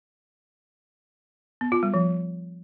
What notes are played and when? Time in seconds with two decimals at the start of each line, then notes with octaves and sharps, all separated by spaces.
1.61 B3
1.72 F4
1.83 G3
1.94 F3